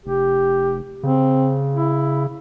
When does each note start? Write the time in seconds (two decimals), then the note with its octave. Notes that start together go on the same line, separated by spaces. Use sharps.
0.06 F1 G4
1.03 C#3 C4
1.76 E4